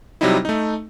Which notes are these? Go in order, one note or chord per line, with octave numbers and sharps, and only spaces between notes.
C3 F#3 G3 C4 D#4 E4
A3 D#4